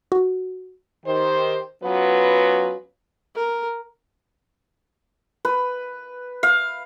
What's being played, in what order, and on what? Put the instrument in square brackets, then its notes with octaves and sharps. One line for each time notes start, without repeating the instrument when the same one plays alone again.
[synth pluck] F#4
[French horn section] D#3 G4 C5
F#3 B3 C#4 F4 B4
[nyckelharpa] A#4
[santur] B4
F5